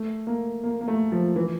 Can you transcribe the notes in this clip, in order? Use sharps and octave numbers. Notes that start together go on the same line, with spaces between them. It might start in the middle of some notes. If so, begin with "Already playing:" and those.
Already playing: A3
A#3
A#3
A#3
A3
F3
E3